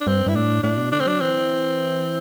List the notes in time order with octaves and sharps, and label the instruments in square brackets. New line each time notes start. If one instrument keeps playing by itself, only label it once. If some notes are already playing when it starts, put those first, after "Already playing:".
[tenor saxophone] D4
[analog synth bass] G2 [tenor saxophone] C4
[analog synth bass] G2 [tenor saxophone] E4
[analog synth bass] A2 [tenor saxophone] D4
[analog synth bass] A2 [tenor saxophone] D4
[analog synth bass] B2
[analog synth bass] D3 [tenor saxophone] D4
[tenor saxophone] C4
[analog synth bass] F#3 [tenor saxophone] D4
[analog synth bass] E3 [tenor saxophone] C4